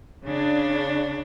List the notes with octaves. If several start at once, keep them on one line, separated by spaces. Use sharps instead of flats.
C#3 D4